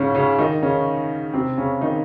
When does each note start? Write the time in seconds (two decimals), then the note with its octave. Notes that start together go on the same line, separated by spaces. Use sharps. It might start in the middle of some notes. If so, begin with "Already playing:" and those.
Already playing: G#2 C#3 C#4
0.15 C#3 C#4
0.38 D#3 D#4
0.62 C#3 C#4
1.34 C3 C4
1.58 C#3 C#4
1.81 D#3 D#4